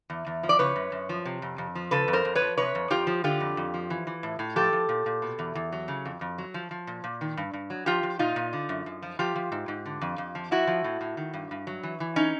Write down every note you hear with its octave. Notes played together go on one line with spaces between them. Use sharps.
E2
E2
F3
D5
C#3 B4 C#5
F#2
F#2
F3
C3
F2
F2
F3
C#3 A4 B4
F2
A#4 C5
F2
B4 C#5
F3
C3 B4 C#5
F2
F2 F4 G4
F3
D3 F4 G4
F2
F2
F3
E3
E3
A2
A2
F3 G4 A4
F3
A#2
A#2
B2
E2
E2
F#3
C#3
F2
F2
F#3
F3
F3
A#2
A#2
D#3
G2
G2
F#3
F3 F4 G4
F3
A#2 D#4 F4
A#2
D3
F#2
F#2
F3
F3 F4 G4
F3
G#2
G#2
D3
F2
F2
F3
F3 E4 F#4
F3
A2
A2
D#3
G2
G2
F#3
E3
E3
C#4 D#4